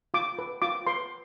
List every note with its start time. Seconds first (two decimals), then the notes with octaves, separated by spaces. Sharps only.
0.14 F4 D6
0.39 B4
0.62 F4 D6
0.87 B4 C6